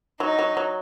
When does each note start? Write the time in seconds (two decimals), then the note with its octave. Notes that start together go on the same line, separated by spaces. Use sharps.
0.20 F#3 D#4
0.39 F#3
0.57 F#3